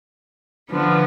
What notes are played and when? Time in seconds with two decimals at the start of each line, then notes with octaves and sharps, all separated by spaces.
0.70 D3 F3 B3 D4